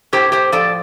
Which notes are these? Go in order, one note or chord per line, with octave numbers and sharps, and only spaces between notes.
A2 G4 C5
G4 C5
F3 A4 D5